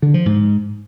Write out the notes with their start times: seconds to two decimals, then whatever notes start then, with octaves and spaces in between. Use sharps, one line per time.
0.02 D3
0.14 F3
0.26 G#2